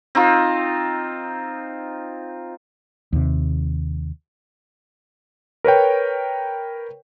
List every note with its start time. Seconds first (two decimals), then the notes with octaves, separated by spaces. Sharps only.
0.15 C4 D#4 F4
3.13 D#2 C3
5.64 A#4 B4 C#5 G5